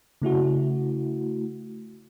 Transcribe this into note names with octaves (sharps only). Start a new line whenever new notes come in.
C#3 A3 E4 F#4